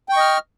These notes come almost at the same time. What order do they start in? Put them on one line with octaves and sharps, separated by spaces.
G5 C#6 D#5 F6